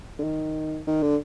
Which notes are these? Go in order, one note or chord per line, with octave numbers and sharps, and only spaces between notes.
D3
D#3
D#3
D3